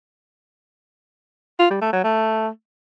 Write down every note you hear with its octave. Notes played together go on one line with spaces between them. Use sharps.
F4
G3
A3
F#3
A3